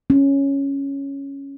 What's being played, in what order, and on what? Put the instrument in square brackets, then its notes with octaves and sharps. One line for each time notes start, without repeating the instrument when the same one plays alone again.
[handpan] C#4